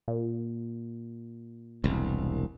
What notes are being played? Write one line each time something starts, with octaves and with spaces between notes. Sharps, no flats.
A#2
E1 C2